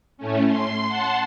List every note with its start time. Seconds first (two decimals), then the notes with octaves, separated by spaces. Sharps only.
0.18 A2 A3 C#4
0.47 C6
0.87 F#5 A5 C6